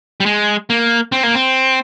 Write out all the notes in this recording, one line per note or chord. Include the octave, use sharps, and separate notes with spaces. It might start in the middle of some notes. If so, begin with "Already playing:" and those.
G3
G#3
A#3
C4
A#3
C4